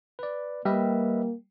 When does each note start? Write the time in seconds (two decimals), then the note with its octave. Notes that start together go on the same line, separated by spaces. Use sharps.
0.19 B4 D5
0.65 G3 A#3 B4 D#5 E5